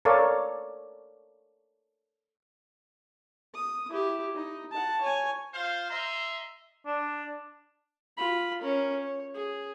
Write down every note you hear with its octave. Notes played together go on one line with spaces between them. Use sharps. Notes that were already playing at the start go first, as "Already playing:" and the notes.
A4 A#4 C#5 D5 F5
D#6
E4 G4
D#4
F#5 A5
C#5 G#5
F4 C5 F5
D#5 E5 A#5 C6
D4
F4 B5
C#4 A#4
C#5
G#4